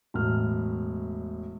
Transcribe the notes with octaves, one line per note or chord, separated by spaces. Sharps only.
E1 A2 F6